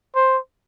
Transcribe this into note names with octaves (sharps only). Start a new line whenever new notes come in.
C5